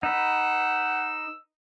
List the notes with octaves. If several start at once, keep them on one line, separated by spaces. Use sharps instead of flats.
D#4 B4 F#5 E6